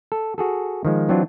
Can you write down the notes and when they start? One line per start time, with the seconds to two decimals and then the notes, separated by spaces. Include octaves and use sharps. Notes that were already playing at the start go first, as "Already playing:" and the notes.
0.12 A4
0.38 F#4 G#4 A4
0.85 D#3 F3 G#3
1.09 E3 F#3 C4 D4 F4